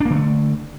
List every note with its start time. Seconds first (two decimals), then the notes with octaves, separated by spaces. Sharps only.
0.01 D4
0.06 A#3
0.10 D3
0.15 A3